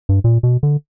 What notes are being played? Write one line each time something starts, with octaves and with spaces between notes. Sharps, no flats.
G2
A#2
B2
D3